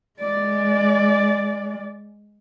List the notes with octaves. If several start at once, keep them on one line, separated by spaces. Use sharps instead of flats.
G#3 D5